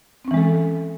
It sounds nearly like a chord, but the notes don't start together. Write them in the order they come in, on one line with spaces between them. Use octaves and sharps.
C4 C#4 E3 G#3 A4